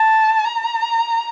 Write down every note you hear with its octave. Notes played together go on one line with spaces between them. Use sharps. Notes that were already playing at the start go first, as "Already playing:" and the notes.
Already playing: A5
A#5